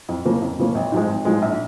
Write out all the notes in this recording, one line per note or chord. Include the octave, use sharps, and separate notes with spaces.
F2
C#3 F3 A#3 C#4
F2
C#3 F3 A#3 C#4
G#1
G#2 F3 G#3
G#1
G#2 F3 G#3
A#1